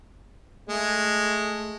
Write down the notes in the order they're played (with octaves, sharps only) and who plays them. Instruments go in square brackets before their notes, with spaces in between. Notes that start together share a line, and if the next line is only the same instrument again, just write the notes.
[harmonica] G#3 [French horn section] A3